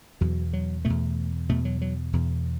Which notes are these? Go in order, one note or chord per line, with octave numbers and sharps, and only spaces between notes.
E2 B2 F#3
F#3
E2 B2 A3
E2 B2 A3
F#3
F#3
E2 B2